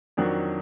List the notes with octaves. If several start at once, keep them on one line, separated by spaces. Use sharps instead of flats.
F2 D#3 F#3 D4 F#4